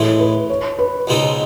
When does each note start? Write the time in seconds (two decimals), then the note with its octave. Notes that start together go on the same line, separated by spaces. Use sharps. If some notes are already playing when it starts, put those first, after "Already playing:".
Already playing: A2 E3 G#3
0.20 B4
0.50 C#5
0.79 B4
1.07 C#2 B2 G#3 C4 D#4